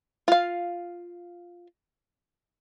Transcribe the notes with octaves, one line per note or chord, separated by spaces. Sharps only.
F4 F5